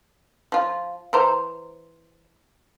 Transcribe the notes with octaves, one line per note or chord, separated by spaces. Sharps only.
F3 F4
E3 C5 A#5